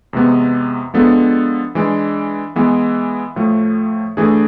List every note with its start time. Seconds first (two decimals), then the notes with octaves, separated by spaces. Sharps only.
0.13 E2 C3 G#3 B3
0.94 F3 G#3 B3 D4 A4
1.75 E3 G#3 D4
2.56 E3 G#3 B3
3.36 A2 F3 A3
4.17 E3 A3 D4 G#4